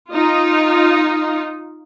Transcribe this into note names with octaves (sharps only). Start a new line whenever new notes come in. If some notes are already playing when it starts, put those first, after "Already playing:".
D#4 F4